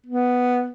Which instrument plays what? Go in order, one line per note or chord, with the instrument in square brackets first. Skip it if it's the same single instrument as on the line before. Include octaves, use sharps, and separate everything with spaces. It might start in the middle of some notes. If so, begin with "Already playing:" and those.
[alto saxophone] B3